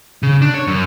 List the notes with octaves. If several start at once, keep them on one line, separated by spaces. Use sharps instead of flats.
C#3
D4
C#5
F#2